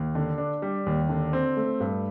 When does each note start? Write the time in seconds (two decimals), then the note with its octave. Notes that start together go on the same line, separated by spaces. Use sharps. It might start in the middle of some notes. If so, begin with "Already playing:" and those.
Already playing: D#2
0.15 D3
0.38 D4
0.62 G3
0.86 D#2
1.09 D3
1.33 C4
1.57 A3
1.80 G2